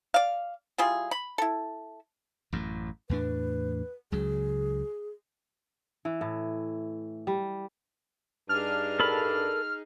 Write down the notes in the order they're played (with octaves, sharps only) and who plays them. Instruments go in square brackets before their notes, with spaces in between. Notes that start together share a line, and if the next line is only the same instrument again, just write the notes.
[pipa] D5 F5
G3 E4 F4 G#4
B5
E4 A4
[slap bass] A1 F#2 A2
[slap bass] E2 A2 D4 [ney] B4
[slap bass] C#2 C#3 F#3 [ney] G#4
[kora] E3
A2
G3
[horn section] G2 D4 [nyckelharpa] D#4 G#4 [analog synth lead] F6
[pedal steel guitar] A4 A#4 B5